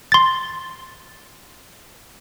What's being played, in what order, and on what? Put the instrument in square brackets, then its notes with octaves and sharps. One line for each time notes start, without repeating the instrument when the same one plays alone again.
[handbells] C6 A6